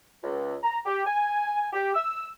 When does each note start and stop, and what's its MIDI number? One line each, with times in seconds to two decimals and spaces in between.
0.23 0.56 37
0.63 0.79 82
0.85 1.05 67
1.06 1.67 80
1.72 1.92 67
1.95 2.28 88